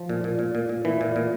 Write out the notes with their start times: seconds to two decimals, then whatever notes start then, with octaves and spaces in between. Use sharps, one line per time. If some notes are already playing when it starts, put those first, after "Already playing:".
Already playing: F3
0.09 A#2
0.24 A#2
0.39 A#2
0.55 A#2
0.69 A#2
0.85 A#2 E3
1.01 A#2
1.16 A#2